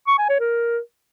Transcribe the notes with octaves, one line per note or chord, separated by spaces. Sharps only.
C#6
G#5
C#5
A#4